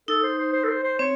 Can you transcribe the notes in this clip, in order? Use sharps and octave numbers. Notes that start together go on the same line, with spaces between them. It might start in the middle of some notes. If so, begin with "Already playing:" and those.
D#4 A4
C5
C5
C5
A4
C5
C5
C4 C#5